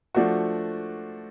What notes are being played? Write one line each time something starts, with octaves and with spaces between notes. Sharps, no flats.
F3 A3 D4 F#4